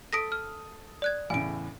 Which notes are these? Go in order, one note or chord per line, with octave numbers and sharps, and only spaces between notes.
A4 D#6 A#6 B6 D7
F6
D5 F#6 G#6
E2 A2 C#3 G#5 D7